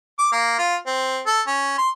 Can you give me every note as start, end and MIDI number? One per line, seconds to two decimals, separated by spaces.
0.19 0.29 86
0.33 0.56 58
0.59 0.76 65
0.87 1.20 60
1.26 1.41 69
1.47 1.78 61
1.78 1.89 84